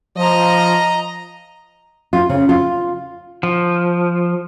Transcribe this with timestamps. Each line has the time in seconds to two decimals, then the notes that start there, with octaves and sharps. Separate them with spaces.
0.17 F3 D#5 A#5
2.13 F4
2.29 C#3
2.49 F4
3.43 F3